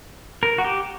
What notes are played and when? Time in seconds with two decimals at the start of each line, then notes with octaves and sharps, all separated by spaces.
0.43 A#4
0.58 F#4
0.65 G4